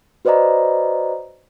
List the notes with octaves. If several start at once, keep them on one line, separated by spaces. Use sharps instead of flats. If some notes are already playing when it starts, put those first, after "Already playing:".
F#4 B4 C5 D5 D#5 A#5